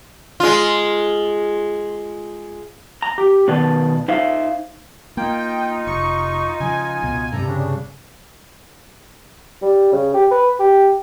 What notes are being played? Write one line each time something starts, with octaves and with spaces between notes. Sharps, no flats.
G#3 F4
A#5
G4
B2 D#3 B4 D5 A5
D#4 C5 E5 F5
A#3 D#4 F4 G5
F1 C#6
C#3 F3 G#5
C#2 B2
G2 C3 G3 A4 A#5
C#3 D4
G3
C#3
G4
B4
G4